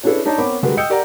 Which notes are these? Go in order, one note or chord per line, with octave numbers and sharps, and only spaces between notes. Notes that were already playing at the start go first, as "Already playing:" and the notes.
C#4 D4 E4 G#4 A4 B4
D4 D#4 C#5 A5
B3 C4 A#4 C#5 B5 D6
D3 G3 G#3 F#4 A#4 B4
D#5 G5 D#6 E6 G6 C#7
G4 A#4 D5 F#5 A#5